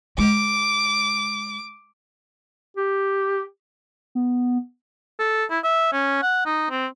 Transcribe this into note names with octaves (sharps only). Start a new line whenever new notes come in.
G#3 D6
G4
B3
A4
E4
E5
C#4
F#5
D#4
C4